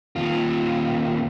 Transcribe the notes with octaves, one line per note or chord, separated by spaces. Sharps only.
D#2 F4